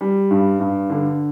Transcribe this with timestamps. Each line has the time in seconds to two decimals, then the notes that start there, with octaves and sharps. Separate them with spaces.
0.01 G3
0.31 G2
0.60 G2
0.90 D3